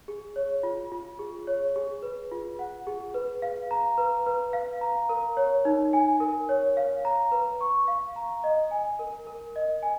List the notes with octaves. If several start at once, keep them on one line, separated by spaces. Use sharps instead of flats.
G#4
C#5
F4
F4
G#4
C#5
G#4
B4
F4
F#5
G#4
B4
F5
A#5
B4
B4
F5
A#5
A#4
C#5
D#4
G#5
A#4
C#5
F5
A#5
B4
C#6
F5
A#5
D#5
G#5
A#4
A#4
D#5
G#5